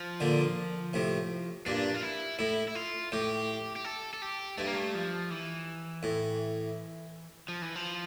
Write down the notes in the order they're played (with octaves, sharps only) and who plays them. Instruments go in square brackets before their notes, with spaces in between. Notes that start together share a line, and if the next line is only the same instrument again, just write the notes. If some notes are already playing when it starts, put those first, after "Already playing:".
Already playing: [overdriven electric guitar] F3
[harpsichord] A#2 D3
A2 C3
[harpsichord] G2 A#2 [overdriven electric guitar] D4
[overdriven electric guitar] F4
E4
[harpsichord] A2 [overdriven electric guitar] E4
[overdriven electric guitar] E4
F4
[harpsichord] A2 [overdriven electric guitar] G4
[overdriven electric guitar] G4
A4
A4
G4
[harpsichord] G2 [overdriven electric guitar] A3
[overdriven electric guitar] A#3
A3
F3
E3
[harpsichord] A2
[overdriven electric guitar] F3
E3
F3